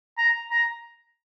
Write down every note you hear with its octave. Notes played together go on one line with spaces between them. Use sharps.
A#5
A#5